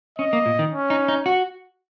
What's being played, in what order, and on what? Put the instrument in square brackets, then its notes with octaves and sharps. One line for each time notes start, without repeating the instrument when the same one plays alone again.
[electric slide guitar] C#4 [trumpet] D#5
[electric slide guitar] A#3
A#2
D#3
[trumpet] C#4
[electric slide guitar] D#4
D#4
F#4